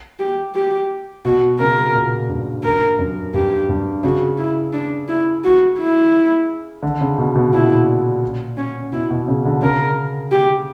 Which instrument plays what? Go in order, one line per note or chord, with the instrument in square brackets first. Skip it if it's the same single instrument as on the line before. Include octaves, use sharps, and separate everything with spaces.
[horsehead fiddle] G4
G4
[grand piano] B2 [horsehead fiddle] F#4
[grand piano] C#3 [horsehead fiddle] A#4
[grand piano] A#2
G2
[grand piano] G2 [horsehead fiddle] A#4
[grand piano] F#2
[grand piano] G2 [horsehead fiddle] G4
[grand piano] G2
[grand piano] C#3 [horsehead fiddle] F#4
[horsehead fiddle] E4
D4
E4
F#4
E4
[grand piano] D3
C#3
B2
B2
[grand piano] A#2 [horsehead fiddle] E4
[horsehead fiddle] C#4
[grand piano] B2 [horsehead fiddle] E4
[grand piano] B2
C#3
D3
[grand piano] C#3 [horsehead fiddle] A#4
[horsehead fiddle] G4